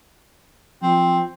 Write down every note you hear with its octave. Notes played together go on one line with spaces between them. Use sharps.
F3 C4